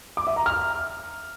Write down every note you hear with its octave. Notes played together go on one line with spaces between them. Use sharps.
D6
E5
A#5
F6